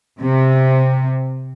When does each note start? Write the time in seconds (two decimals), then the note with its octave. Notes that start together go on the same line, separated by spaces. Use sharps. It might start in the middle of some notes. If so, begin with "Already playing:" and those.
0.20 C3